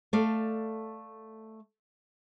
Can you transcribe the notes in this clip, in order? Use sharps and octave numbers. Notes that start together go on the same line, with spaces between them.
A3 A4 D5 F5